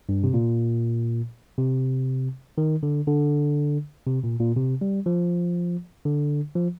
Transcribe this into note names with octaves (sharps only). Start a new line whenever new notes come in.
G2
C3
A#2
C3
D#3
D3
D3
C3
A#2
A#2
C3
G3
F3
D3
F3